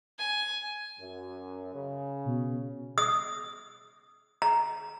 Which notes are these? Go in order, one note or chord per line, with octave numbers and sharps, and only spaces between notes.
G#5
F#2
C#3
B2
D#6
A#5